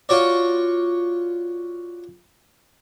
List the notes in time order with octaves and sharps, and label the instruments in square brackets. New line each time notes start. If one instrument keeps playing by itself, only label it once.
[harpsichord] F4 F#4 C#5 D5